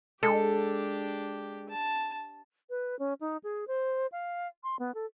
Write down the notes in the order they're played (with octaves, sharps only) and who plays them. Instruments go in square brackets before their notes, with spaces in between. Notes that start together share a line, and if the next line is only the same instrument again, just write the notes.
[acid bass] G#3 [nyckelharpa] D4 G4 [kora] A4
[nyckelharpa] A5
[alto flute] B4
C#4
D#4
G#4
C5
F5
C6
B3
A4